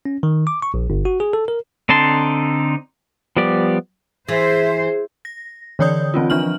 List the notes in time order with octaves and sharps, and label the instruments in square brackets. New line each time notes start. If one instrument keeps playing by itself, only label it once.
[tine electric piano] C#4
D#3
D6
C#6
A#1
G1
F#4
G#4
A4
A#4
[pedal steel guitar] D3 C4 D#4 A5 C6
F3 G3 B3 G4 D5
[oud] E3 [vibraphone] G#4 [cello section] C5 [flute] E5
[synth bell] A#6
D3 E3 C#5 D5 D#6 G6
E3 C4 C#4 F4
F3 D4 F6 F#7